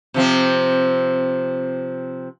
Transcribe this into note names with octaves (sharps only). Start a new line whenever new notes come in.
C3 F3 C4